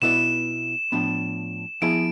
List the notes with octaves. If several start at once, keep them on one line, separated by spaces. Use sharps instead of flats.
B2 B3 E4 B4 D5 E7
A2 F3 B3 D4
F3 B3 E4 G#4 D7